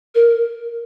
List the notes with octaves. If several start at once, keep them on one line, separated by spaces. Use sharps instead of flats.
A#4